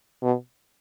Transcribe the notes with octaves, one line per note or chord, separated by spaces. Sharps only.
B2